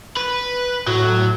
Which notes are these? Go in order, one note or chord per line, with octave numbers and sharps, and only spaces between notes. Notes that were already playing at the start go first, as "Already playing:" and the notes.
B4
A2 F#3